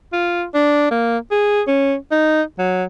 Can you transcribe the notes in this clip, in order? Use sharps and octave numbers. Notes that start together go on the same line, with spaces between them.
F4
D4
A#3
G#4
C#4
D#4
F#3